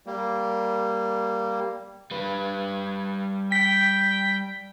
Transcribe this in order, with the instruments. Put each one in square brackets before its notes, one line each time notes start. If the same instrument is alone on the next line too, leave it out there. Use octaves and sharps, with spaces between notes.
[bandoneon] G3 A#3
[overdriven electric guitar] G3 B4
[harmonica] G5 [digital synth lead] B6